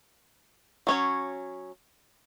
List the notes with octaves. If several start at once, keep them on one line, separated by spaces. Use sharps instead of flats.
F#3 C#4 C#5